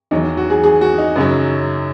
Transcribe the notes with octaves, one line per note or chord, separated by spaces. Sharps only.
E2 D#3 F#3 D#4
F#4
G#4
G#4
F#4
D#4
F#2 C#3 F#3